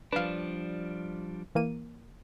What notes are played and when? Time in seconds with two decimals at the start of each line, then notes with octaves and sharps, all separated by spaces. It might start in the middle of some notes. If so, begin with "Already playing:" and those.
0.12 F3 G3 D4 B4 F5
1.55 E3 A#3 D#7